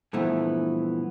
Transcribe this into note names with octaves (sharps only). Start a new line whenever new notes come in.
G2 A#2 E3 F3 A3 B3